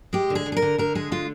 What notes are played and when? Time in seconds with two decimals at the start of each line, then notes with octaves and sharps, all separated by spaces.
0.13 G#3 G4
0.30 D3
0.35 G#4
0.46 D3
0.52 G#4
0.56 A#4
0.62 D3
0.78 D3 A#4
0.95 G#3 G#4
1.12 D3 F4